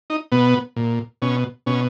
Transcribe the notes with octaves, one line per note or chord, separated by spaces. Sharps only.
D#4
B2 B3
A#2
B2 C#4
B2 C#4